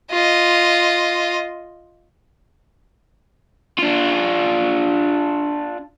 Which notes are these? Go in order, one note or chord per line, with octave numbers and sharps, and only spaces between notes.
F4 D#5
D4 F4